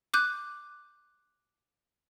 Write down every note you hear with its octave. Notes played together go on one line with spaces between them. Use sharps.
D6 F#6 G6